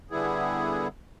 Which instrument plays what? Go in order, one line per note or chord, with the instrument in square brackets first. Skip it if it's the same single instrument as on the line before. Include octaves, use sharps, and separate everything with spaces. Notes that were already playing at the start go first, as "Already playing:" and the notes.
[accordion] D3 G3 B3 E4 G#4